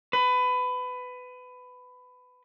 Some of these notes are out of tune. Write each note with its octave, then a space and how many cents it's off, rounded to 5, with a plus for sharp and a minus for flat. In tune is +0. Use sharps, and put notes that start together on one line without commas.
B4 +20